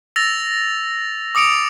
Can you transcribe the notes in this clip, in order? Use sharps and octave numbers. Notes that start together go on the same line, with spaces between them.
E6 A6 A#6 F7
D6 D#6 C#7 D7 F7